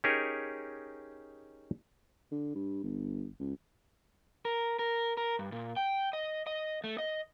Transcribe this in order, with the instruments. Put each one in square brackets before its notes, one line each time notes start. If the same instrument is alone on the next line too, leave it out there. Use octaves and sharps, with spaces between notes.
[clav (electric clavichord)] C#4 D#4 G4 G#4 A#4 C#5
[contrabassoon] D3
G2
G1
C#2
[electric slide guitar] A#4
A#4
A#4
G2
A#2
G5
D#5
D#5
A3
D#5